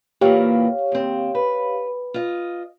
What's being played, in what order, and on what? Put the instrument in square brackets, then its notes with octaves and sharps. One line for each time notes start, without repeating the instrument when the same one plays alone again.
[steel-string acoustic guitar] A#2 E3 A#3 [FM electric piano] G4 C#5 F5
[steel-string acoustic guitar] D#2 C4
B4
F4 D#5